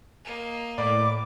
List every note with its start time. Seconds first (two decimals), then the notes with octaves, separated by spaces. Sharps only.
0.25 A#3 D#5
0.78 A2 D5 B5 D6